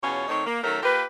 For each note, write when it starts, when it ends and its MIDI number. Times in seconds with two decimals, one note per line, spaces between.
0.03 0.26 40
0.03 0.26 47
0.03 0.26 61
0.03 0.26 65
0.03 0.26 73
0.28 0.46 51
0.28 0.46 57
0.28 0.46 60
0.28 0.46 63
0.28 0.46 73
0.46 0.60 58
0.64 0.78 51
0.64 0.78 54
0.64 0.78 57
0.64 0.78 61
0.64 0.78 69
0.64 0.78 70
0.83 1.03 58
0.83 1.03 65
0.83 1.03 67
0.83 1.03 70
0.83 1.03 71